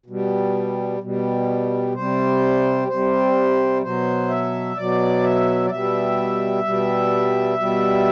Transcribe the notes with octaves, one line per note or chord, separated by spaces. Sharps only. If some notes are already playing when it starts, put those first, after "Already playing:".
B2 G3
B2 G3
C3 G3 C5
C3 G3 C5
B2 F#3 C5
E5
B2 F#3 D5
E5
D5
B2 G3 E5
B2 G3
B2 G3